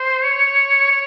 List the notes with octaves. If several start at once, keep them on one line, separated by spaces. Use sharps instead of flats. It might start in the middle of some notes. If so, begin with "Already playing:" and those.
Already playing: C5
C#5
C#5